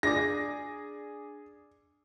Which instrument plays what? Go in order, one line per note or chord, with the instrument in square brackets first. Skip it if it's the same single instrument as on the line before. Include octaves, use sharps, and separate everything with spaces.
[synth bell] D4 [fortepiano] G#4 D5 D6 [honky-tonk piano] A#6